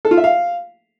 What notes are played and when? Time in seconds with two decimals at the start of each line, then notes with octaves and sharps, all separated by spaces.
0.05 A4
0.11 F4
0.17 E5
0.24 F5